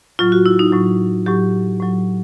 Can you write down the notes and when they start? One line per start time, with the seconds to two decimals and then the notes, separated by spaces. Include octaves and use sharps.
0.19 A2 F#3 F4
0.32 F#4
0.46 E4
0.59 D#4
0.72 A2 F#3
1.26 A2 F#3 G4
1.80 A2 F#3